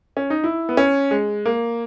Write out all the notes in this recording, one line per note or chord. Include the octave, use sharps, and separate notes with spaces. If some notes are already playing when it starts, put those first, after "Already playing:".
C#4
D#4
E4
B3
C#4
G#3
A#3